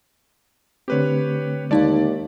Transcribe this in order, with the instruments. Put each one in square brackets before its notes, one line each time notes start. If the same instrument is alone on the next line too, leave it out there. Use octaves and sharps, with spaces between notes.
[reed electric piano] D3 A3 C4 [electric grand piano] G4 B4 C#5
[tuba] D#2 [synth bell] G#3 D#4 F5 [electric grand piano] D5 A5